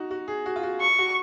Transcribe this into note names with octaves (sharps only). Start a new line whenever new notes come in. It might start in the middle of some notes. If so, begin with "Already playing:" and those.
Already playing: D#4 F#4
F#4
G#4
F#4
F4
F#4
C#6
F#4